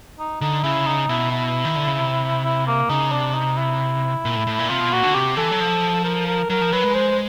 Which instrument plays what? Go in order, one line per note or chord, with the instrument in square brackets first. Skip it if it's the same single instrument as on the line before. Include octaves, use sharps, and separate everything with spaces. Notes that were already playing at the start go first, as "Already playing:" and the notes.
[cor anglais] D#4
[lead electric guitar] D3 [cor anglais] D#4
[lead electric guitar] C#3 [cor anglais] E4
[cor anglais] D#4
[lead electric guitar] B2 [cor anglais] E4
[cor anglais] E4
[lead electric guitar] D#3
D3
C#3
C3
[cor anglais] E4
A#3
[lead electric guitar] C#3 [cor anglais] D#4
[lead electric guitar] C3 [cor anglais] D4
[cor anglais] D#4
E4
[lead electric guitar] A#2
A2
A2
A#2
[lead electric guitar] C3 [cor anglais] F4
[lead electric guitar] B2
[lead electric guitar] A#2 [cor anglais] F#4
[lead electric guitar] D3
[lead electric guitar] C3 [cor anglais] G4
[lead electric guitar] E3 [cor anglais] A4
[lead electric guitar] F#3
F3
[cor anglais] A#4
A#4
[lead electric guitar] F#3 [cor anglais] A#4
[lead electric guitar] F3
[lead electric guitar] F#3 [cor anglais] B4
[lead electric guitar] G#3
[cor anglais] C5